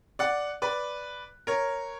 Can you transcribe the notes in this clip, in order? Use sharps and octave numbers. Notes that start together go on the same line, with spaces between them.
D5 F#5
B4 D5
A#4 C#5